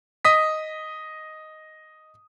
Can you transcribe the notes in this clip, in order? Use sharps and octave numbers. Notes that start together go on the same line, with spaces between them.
D#5 D#6 B6